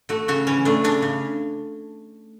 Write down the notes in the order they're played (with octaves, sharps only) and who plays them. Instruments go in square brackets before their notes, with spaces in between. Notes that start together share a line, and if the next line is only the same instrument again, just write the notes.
[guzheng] A3 F#4
C#3 F#4
E3 C#4
A3 D4
C#3 D4
C#3